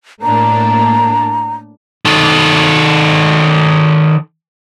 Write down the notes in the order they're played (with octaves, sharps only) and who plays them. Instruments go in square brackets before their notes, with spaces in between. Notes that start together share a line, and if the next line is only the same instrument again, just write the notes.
[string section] A2 A#3 D4 [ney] A#5
[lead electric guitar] D#3 A4